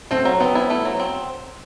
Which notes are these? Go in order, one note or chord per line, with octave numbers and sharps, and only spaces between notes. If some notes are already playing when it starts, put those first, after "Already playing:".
A3 C4
F#3
B3 C4
E4
A3
F#3
C4